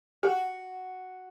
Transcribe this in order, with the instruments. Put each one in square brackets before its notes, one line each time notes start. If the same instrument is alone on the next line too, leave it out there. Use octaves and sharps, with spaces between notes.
[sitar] F#4 [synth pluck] G4 F6